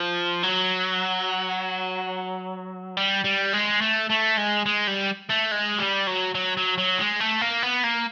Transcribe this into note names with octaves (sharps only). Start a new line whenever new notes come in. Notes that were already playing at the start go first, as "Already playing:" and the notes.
Already playing: F3
F#3
G3
G3
G#3
A3
A3
G#3
G#3
G3
A3
G#3
G3
F#3
F#3
F#3
F#3
G#3
A3
A#3
B3
A#3